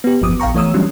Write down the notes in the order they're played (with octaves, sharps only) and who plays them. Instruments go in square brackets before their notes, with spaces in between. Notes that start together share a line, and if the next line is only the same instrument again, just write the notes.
[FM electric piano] B3 G4
G1 E2 F3 D6 D#6
A#1 F5 G5 A#5 C#6
E3 A3 C#5 D#6 E6
E3 F#3 G3 A3 C#4 D4